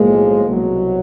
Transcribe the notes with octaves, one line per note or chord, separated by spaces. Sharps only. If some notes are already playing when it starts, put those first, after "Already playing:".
Already playing: B1 A2 F3 G#3 A#3
C2 B2 F#3